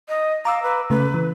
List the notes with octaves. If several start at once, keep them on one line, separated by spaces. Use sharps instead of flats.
D#5
F5 A#5 D6 E6
B4
C#3 A3 B4
E3